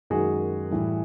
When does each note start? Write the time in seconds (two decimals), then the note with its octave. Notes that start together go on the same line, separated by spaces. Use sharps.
0.10 F#2 D#3 G#3 F#4 G#4
0.71 A2 E3 G3